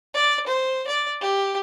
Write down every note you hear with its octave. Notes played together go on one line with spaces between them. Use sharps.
D5
C5
D5
G4